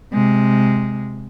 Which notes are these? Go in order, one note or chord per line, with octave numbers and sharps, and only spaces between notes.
C3 G#3